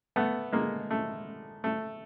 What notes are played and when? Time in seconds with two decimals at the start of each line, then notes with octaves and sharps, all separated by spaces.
0.16 A3 B3
0.53 G#3 A#3
0.91 A3
1.64 A3